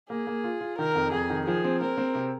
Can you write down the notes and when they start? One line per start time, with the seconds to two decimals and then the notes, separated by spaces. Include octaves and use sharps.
0.10 A#3 G#4
0.27 A#3
0.44 F4
0.61 F4
0.79 D#3 A#4
0.95 F2
1.12 F2 G#4
1.30 D#3
1.46 F3 G#4
1.64 C4
1.81 C4 A#4
1.97 C4
2.15 C3